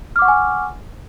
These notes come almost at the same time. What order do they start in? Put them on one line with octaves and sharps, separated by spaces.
F6 D6 F#5 C#6 G#5